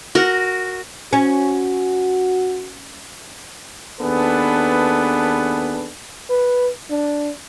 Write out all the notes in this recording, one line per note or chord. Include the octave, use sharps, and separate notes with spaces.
F#4 A#4
C#4 F#4
D#2 B3 D4 G#4 A4 B4
B4
D4